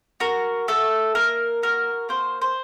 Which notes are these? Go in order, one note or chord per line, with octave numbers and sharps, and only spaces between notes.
F#4 A#4
A3 A4
A#3 A#4
F#4 A#4
A#3 C5
C5